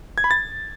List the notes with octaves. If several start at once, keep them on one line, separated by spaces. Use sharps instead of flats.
G#6
B5
A6